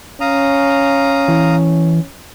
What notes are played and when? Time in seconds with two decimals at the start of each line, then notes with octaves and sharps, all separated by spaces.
0.21 C#4 F5 A#5 D#6
1.28 E3